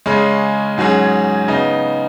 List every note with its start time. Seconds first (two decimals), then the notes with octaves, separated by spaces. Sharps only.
0.06 C#3 G#3 C#4
0.78 G#2 F#3 C#4 G#4
1.48 C#3 B3 D#4